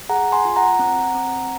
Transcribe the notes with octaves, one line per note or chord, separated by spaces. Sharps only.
G#4 F#5 A#5
G#5 C6
F4
F#5 A#5
C4
C4